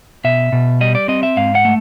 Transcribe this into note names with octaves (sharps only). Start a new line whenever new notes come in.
B2 E5
B2
G3 D#5
D5
C4 D#5
E5
G#2 F5
F#5
A3